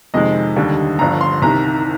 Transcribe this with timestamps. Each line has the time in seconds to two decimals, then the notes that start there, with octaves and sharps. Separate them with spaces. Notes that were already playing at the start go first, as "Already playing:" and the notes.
0.14 F2 C3 D#3 G#3 D#5
0.56 D#2 D3 G3
0.99 G1 G2 D3 F3 A#5
1.21 C6
1.42 C2 C3 D#3 A#5